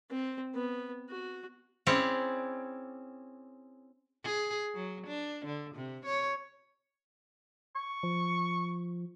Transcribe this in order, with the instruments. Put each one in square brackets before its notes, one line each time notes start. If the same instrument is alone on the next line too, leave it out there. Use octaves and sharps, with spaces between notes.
[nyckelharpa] C4
B3
F#4
[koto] C4 C#4 E4 G#4 C#5 D5
[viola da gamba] G#4
F#3
D4
D3
C3
C#5
[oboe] C#6
[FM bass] F3